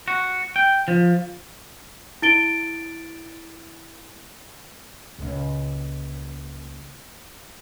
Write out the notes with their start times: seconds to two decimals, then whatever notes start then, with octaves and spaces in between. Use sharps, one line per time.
0.08 F#4
0.56 G5
0.88 F3
2.22 E4 A6 D7 G7
5.18 C#2 A#2